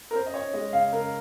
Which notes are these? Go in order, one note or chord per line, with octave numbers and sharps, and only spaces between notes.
A#4
C#4 C5
D#5
C#4 C#5
G#3 D#5
C#3 F5
C#3 A#4